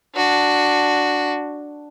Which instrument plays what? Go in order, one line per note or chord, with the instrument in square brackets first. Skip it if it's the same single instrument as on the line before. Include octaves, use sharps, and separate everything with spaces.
[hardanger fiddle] D4 F#4